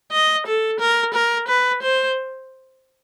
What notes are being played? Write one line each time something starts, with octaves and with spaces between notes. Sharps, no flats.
D#5
A4
A#4
A#4
B4
C5